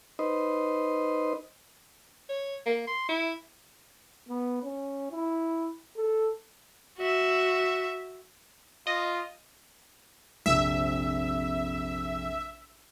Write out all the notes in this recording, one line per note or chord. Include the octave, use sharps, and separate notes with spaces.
D#4 B4 C5 D#5
C#5
A#3
C6
E4
B3
C#4
E4
A4
F#4 E5
F4 D#5
A#1 F2 C3 E5